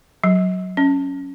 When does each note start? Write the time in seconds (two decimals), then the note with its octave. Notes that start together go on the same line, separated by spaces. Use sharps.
0.24 F#3
0.77 C#4